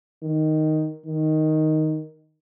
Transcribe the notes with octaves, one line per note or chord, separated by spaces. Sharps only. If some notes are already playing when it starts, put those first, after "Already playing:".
D#3
D#3